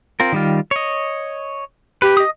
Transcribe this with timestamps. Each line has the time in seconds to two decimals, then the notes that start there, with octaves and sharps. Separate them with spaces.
0.20 C4 F4 A#4
0.32 D#3 G3 F4
0.71 C#5 D#5
2.02 G4 B4
2.17 D#5 D#6